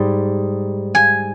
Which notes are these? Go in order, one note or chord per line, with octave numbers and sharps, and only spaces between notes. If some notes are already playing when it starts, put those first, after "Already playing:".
Already playing: G#2 G3
G#5